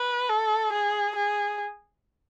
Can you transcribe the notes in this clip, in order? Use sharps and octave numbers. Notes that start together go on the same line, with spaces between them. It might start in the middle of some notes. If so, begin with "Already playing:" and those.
Already playing: B4
A4
G#4
G#4